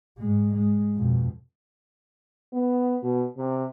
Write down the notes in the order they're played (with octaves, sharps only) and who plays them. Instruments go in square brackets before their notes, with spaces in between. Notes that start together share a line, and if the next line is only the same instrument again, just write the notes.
[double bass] G#2 G#3
G#3
F2 B2
[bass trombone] B3
B2
C3